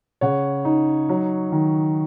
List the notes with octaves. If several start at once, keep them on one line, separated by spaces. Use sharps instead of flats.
C#3 C#5 F#5
D#4
F#3
D#3